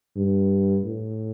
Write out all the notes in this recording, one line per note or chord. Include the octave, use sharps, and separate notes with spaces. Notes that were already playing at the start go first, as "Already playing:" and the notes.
G2
A2